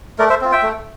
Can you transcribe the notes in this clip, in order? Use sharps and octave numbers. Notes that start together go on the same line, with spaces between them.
A3 A#4 D5
C5 E5
C4 F4
E5 G5
A3